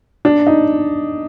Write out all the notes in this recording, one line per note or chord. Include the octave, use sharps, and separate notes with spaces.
D4
D#4